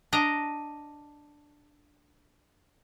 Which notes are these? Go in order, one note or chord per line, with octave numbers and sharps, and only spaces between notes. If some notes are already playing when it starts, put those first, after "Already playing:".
D4 D#5 A#5